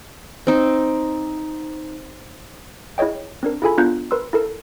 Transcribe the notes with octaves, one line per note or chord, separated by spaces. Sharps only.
C4 D#4
E4 G#4 C#5 D#5 G5
C4 D4 A#4
E4 F4 G#4 A4 G#5 B5
B3 D4 F4 A#5 F#6 G6
A#4 B4 C6 E6
E4 A4 A#4